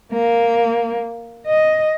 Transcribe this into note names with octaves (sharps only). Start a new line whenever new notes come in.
A#3
D#5